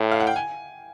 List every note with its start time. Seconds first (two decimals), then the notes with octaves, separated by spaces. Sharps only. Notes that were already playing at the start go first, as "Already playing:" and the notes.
Already playing: A2 G5
0.11 F5
0.20 F#5
0.27 G5
0.36 G#5